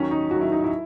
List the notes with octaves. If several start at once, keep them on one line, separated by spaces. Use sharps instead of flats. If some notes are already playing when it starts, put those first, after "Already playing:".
Already playing: D#2 D#3 F#3 C#4
D#4
D#2 D#3 F#3 F#4
E4
D#4
E4